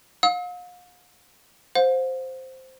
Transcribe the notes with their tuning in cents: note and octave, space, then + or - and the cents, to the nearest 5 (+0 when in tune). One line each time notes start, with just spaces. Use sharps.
F5 +40 E6 -45
C5 +0 F5 +45